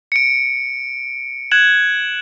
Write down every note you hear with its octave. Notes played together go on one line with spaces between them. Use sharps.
C#7 D7
F#6 G#6 E7 F#7